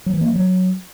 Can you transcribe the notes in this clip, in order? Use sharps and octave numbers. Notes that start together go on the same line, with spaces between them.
F#3
E3
A#3
F3
F#3